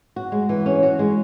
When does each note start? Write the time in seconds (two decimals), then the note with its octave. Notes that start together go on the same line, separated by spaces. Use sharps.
0.16 F#4
0.32 G#3
0.49 E3
0.66 C#4
0.83 F#4
0.99 G#3